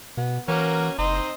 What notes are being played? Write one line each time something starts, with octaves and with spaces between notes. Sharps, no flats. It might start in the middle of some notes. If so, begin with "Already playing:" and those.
B2 B3
E3 A#3 C#4 F#4 A#4
F#1 C4 D#4 C5 D#5